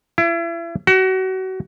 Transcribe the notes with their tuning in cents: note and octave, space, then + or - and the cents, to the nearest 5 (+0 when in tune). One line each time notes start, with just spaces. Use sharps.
E4 +35
F#4 +30